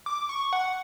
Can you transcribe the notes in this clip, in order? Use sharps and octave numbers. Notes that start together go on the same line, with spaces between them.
D6
C#6
F#5